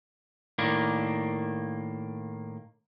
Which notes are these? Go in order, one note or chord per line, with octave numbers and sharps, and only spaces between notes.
A2 D#3 A#3 D4